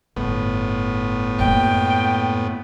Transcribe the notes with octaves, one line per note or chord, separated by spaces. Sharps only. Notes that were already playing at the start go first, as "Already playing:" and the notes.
G1 A2 B3
F#2 A#3 G5